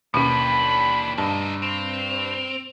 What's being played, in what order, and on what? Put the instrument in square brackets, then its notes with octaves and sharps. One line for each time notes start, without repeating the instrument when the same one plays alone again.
[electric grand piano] D#2 [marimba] B2 C#4 [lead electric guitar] E3 D4 [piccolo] B5
[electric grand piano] G2 [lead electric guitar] D3 D#4 [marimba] A5
[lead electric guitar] C4 [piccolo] F7